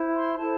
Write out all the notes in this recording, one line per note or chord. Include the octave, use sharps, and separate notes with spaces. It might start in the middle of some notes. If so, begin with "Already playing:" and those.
Already playing: E4 C5
C6
E4 A4 C5 A5